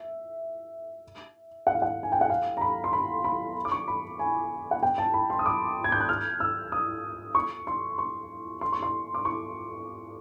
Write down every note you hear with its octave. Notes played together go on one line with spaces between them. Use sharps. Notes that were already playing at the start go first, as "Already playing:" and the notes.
Already playing: E5
F#5
F5
F#5
G#5
G5
F#5
F5
A#5
B5
C6
B5
B5
D6
C#6
B5
G#5
F#5
G5
A5
B5
C6
D#6
D6
G#6
G6
F#6
F6
E6
D#6
C#6
C6
C#6
C6
C#6
C6
D6
C#6